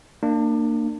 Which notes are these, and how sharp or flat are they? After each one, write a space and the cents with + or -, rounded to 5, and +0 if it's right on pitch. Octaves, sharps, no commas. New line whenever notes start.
A#3 -20 D4 +25